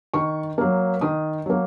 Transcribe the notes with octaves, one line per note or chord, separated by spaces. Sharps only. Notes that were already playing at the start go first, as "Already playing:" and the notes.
D#3 C#6
F#3 A#3
D#3 D#6
F#3 A#3